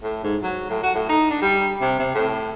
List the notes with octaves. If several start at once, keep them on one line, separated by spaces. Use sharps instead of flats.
A2
G#2
F#3
A2
F#4
A2
D#4
D4
G3
C3
C3
A2